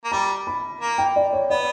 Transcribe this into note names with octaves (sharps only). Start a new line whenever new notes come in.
A#3
G3 A#5
B5
A#3
G5
D5
C#5
B3 D5